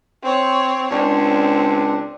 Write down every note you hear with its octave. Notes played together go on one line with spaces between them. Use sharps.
C4 C#5
C#2 C4 D4